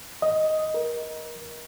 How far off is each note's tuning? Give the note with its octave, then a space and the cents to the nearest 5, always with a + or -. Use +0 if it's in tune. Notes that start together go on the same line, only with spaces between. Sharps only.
D#5 +5
A#4 +30